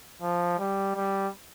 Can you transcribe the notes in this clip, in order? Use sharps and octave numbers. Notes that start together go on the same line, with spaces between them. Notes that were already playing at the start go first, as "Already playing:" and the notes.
F3
G3
G3